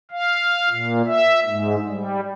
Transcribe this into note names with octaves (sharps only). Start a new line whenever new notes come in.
F5
A#2
E5
G#2
G3